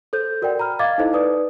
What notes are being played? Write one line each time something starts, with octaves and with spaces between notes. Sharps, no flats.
A4 C5 G6
F#4 A#4 D5 F#5 G5
A#5 B5 F6
D#5 F5 D6 G#6 A6
D#4 E4 A4 C5 D#5
D#4 B4 D5 D#6